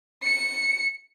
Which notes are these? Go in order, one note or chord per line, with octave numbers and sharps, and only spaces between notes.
C#7